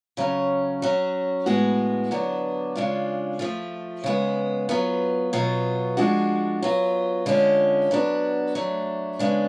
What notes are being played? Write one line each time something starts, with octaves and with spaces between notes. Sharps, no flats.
C#3 F#3 C#4
F#3 C#4 F#4
A2 G#3 B3 F#4
D3 F#3 B3 D4
C#3 G#3 D4 F4
F3 A3 F4
C#3 G#3 B3
F#3 B3 F4
B2 F#3 B3 F4
F3 G#3 D4 F#4
F#3 B3 F4
D3 G#3 C#4 F4
F#3 B3 D4 F#4
F#3 A3 D4
C#3 G#3 B3 D4